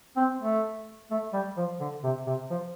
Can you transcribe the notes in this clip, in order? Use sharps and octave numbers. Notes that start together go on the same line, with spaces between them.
C4
A3
A3
G3
F3
D3
C3
C3
F3